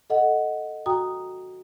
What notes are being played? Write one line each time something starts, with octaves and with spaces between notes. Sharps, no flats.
A4 D#5 F#5
F#4 G5 A#5 D#6